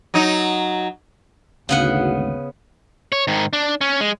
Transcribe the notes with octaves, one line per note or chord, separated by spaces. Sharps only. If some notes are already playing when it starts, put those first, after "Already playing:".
F#3 D#4
G#1 D2 C#3 B3 F#5
C#5
G#2 D#3
D4
C#4
G#3